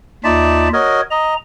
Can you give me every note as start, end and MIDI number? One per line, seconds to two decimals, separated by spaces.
0.24 0.69 39
0.24 0.69 63
0.24 0.69 65
0.24 0.69 74
0.24 0.69 76
0.24 0.69 81
0.73 1.01 66
0.73 1.01 70
0.73 1.01 73
0.73 1.01 75
1.11 1.34 75
1.11 1.37 82